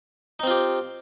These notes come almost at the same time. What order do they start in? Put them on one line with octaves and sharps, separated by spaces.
D#4 C4 F4 G4